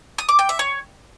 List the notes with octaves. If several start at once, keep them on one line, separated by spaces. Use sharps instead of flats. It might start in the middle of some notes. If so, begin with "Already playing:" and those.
D#6
D6
G5
E5
C#5